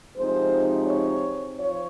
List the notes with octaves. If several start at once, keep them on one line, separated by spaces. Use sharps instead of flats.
C3 F3 G#3 C4 D#4 C5
C#5
F3 C#5